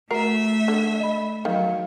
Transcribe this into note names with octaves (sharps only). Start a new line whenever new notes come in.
A3 F#4 A#4 E5 C7
D3
D#5 B5
D#3 F#3 F5